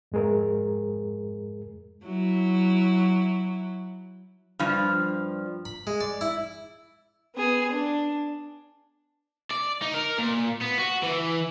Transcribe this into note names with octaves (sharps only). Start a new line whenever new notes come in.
F2 G#2 G#3 G#4 A#4
F#3 E4
G2 F3
B5
G#3
D5
E4
B3 G#4
D4
D5
D#4
A#4
A#2
B3
F#4
E3